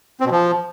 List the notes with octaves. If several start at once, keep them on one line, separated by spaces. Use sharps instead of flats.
C4
B2
F3